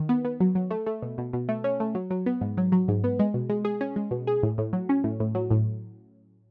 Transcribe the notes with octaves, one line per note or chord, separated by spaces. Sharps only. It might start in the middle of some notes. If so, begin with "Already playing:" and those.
Already playing: D#3
B3
B3
F#3
F#3
A3
A3
B2
B2
B2
A3
C#4
A3
F#3
F#3
B3
G#2
F#3
F#3
G#2
B3
G#3
B2
G#3
G#4
C#4
G#3
B2
G#4
A2
A2
F#3
C#4
A2
A2
F#3
A2